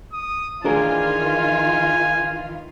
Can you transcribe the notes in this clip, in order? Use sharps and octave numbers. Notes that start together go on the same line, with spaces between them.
D#6
D#3 E3 D4 F4 G#4 A#4 G#5